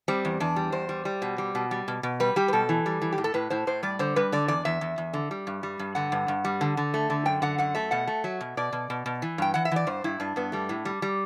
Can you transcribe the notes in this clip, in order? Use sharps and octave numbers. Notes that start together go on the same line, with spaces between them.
G3 C4
E2
E2 D4
G3
E2 C5
G3
G3
B2
G3
B2
G3
B2
B2
G3 B4
G3 G4
B4
B2 A4
E3
G3
E3
G4
A2
A4
A2 B4
A2 C5
A2 C5
G3 D5
D3 C5
G3 B4
D3 D5
E2 D5
E2 E5
E2
E2
D3
G3
G2
G3
G2
D3 F#5
G2
G2
G3
D3
D3
A3
D3
F#2 G5
D3 F#5
F#2 F#5
A3 E5
B2 F#5
A3
F#3 E5
B2
B2 D5
B2
B2
B2
E3
G2 G5
E3 F#5
E5
E3 D5
G2 C5
G2 E4
G2 D4
G2 B3
G3 A3
A2
G3
G3